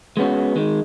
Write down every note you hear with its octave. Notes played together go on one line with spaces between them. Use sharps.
G#3 B3 C#4 F#4
D#3 G#3